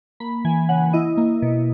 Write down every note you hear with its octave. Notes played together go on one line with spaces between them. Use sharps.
A#3 B5
E3 G#5
C#3 F#5
E4 D#5
A#3
B2